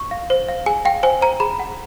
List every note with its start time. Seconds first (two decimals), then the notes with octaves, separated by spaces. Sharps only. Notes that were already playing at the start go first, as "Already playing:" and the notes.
Already playing: C#6
0.11 F5
0.30 C5
0.48 F5
0.66 G#4 G#5
0.85 F5 G5
1.03 C5 G#5
1.21 C5 A#5
1.40 G#4 B5
1.60 F#5